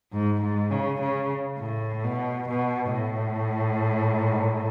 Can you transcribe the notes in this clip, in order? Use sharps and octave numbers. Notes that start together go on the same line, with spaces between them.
G#2
G#2
C#3
C#3
A2
B2
B2
A2